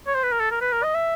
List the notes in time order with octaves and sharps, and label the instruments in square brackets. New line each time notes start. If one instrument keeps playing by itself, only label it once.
[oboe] C#5
C5
B4
A#4
A4
A#4
B4
A#4
D#5
E5